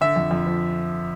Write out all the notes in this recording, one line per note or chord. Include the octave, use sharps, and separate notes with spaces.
D3 E5
F2
F2
F3